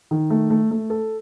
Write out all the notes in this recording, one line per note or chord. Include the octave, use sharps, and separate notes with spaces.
D#3
A3
A3
A3
A4